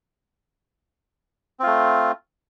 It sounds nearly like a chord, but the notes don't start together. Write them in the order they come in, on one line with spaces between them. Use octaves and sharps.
C4 F4 A3